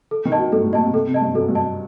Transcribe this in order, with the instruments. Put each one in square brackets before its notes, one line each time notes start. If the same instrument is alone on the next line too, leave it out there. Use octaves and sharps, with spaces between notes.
[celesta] A4
[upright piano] D#3
[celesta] D#5 A5
[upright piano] F#3
[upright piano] G2 [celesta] A4
[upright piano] A2
[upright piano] A#2 [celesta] D#5 A5
[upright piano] C3
[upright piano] C3 [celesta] A4
[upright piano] C3
[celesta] D#5 A5
[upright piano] G2
[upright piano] F#2 [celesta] A4
[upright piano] G2
[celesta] D#5 A5